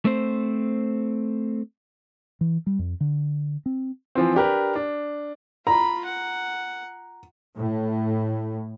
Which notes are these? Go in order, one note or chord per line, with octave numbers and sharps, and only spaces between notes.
A3 C4 C5
E3
G3
F2
D3
C4
E3 F3 C4
D4 G4 A#4 B4
D4
F4 A#5 B5
F#5
A2